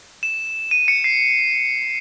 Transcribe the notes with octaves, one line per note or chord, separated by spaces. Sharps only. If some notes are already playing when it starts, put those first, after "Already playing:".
E7
D#7
C#7
C7